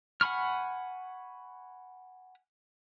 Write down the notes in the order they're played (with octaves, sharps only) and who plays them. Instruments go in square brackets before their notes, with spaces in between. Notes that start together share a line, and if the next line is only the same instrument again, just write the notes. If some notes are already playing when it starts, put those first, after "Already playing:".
[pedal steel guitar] F#5 G#5 B5 C#6 F6